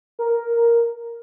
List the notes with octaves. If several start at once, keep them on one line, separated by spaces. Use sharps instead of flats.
A#4